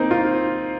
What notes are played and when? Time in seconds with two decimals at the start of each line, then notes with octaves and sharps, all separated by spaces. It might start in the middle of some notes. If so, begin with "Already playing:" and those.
Already playing: A#3 C4 D#4
0.11 F4